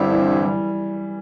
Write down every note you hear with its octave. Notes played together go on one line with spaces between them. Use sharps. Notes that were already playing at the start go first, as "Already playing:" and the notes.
Already playing: G2 D3 G3 C4 E4
E3
E3
G3